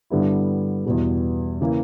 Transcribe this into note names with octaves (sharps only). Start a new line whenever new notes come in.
G2 D3 G3 B3 E4
E2 B2 G3
C#3 E3 A#3